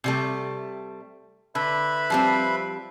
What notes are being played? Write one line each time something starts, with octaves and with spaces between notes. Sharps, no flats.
C3 G3 A3
D3 B4 E5 B5
F3 G3 C4